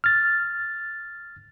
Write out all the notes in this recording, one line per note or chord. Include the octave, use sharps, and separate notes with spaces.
F6 A6